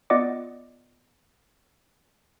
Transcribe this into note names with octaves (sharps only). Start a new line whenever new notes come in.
B3 F4 D5 D#5 F#5 D6